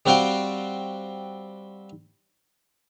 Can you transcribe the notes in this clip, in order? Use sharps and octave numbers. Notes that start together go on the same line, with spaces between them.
G3 C4 F#4 C5 F5 G5